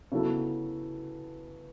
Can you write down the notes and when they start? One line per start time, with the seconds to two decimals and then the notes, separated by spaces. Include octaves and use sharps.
0.12 C#3 F#3 B3 E4 A4